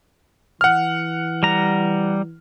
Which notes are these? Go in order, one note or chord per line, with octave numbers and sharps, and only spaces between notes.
E3 F#5 F6
G3 A#5